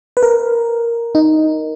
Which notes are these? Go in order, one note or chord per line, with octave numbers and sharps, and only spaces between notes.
B4
A#4
D#4